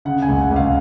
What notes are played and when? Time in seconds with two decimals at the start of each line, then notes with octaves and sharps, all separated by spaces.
0.05 C#3 F#5
0.22 G#5
0.28 C#2
0.39 F#5
0.50 C#2
0.56 F5